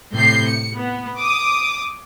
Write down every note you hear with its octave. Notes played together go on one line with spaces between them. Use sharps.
A2 C3 G6 C7
C#7
B3
D6 D#6